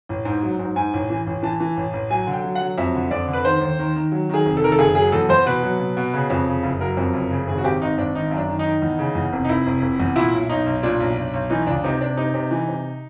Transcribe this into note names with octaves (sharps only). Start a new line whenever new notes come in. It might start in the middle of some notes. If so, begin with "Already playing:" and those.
A1
G#2
F#3
G#2
G#2 G#5
A1
E3
A1
E3 A5
E3
A1
A1
F#3 G#5
D3
G5
F#3
F#5
F#3
F2 E5
D3
F2 D5
D3
B4
D#3 C5
D#2
D#3
D#3
F#3
D#3 G#4
F1
A4
D#3 A#4
A4
F#1 G#4
F#3 G#4
E2 A4
E2 C5
B2 B4
F#3
B2
B2
C#3
F2
C#3
F#1
F#3 A#4
F2
F#1
C#3
G#1 G#4
F#4
G#1 G4
G#1 D#4
G#1 D4
D#3 D#4
F#2
D4
D#3
D#4
D#3
E2
C#3
E2
F1
D#4
F1 E4
F1
F1
E2
A#2 E4
B1
B1 D#4
B1
A#2 D4
B1
B1
B1
E3 D#4
C#2 D4
C3 D#4
C3 D4
C3 D#4
C3
E3
C3